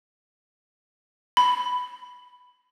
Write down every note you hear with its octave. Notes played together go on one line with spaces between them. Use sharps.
B5